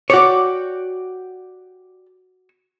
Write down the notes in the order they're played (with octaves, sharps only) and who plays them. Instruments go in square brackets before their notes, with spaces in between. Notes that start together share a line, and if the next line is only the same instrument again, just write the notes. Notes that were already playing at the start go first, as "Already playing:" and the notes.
[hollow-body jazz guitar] F#4 C#5 [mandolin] G4 D5 G5